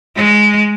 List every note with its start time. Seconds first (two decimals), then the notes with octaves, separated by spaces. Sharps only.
0.16 G#3